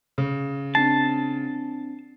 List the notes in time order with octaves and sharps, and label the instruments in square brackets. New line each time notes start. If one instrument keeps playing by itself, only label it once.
[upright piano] C#3
[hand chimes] C4 D4 C7 [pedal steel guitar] A5